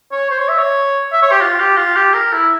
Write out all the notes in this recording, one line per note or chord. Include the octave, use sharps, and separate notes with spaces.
C#5
C5
C#5
E5
C#5
E5
C#5
G4
F4
G4
F4
G4
A#4
E4